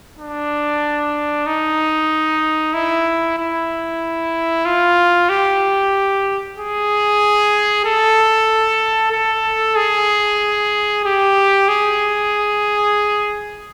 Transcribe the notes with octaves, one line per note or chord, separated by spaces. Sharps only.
D4
D#4
E4
E4
F4
G4
G#4
A4
A4
G#4
G4
G#4